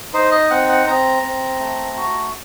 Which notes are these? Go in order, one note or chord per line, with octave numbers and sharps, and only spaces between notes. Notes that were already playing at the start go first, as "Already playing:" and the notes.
D#4 C5
D#5
C4 F#5
F#5
C4 A#5
C4
A3
F#4